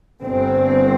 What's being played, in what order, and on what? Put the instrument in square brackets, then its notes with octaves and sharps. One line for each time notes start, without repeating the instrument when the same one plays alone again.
[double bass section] G1 G2 C4